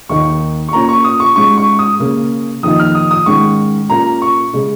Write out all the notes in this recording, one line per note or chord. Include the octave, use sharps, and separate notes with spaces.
D#2 D#3 A#3 D#4 C#6
C#6
A#2 A#3 C#4 A#5
C#6
D#6
C#6
G#2 G#3 C#4 C#6
C#6
D#6
C#3 A#3 C#4
F2 D#3 A#3 D#4 D#6
F6
D#6
D#6
G#2 D#3 G#3 C#4 C#6
A#2 A#3 C#4 A#5
C#6
C#3 G#3 C#4